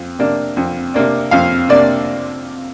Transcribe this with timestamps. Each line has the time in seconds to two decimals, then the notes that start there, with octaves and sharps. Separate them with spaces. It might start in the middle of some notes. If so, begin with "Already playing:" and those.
Already playing: F2
0.19 C3 A#3 D4
0.57 F2
0.94 C3 A#3 D4
1.31 F2 F5
1.69 C3 A#3 D4 D5